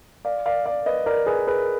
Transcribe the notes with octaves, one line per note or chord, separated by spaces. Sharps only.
D5 F5
D5 F5
D5 F5
B4 D#5
A#4 D5
G#4 B4
G#4 B4